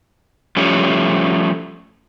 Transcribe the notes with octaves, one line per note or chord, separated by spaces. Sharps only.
F3 G3 A3 C#4